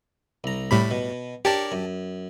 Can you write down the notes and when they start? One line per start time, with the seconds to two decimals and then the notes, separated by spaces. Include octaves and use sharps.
0.44 C2 A#5
0.71 A2 G3 B5
0.91 B2
1.45 D4 G4 A#4 C#5 A5
1.72 F#2